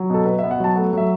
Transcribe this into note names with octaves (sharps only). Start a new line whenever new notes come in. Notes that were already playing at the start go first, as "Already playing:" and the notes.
Already playing: F#3
B2 A4
B2 B4
E5
B3
F#5
F#3 A5
A3 F#5
F#3 E5